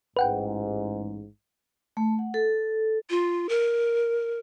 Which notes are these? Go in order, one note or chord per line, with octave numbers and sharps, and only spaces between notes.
A1 G#2 B4 F#5 G5
A3
F#5
A4
F4
A#4